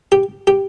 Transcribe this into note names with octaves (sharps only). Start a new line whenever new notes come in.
G4
G4